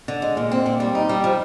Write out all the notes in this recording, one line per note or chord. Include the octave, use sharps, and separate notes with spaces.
D3
G#3
A#2
C4
A#2
G3
D#4
G3
F3